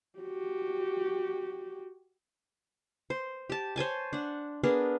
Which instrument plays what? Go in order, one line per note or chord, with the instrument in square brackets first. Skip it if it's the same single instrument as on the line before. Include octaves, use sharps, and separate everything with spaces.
[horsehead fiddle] F#4 G4
[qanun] C5
G4 A5
C5 C#5 G#5 A5
D4 F#5
B3 D4 G#4 A#4